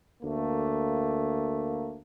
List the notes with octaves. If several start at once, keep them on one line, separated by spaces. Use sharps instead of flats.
D2 A3 A#3